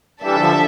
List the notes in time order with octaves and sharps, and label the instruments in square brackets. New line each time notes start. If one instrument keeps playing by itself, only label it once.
[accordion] E3 G3 [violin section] D4 A4 E5
[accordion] D3 F3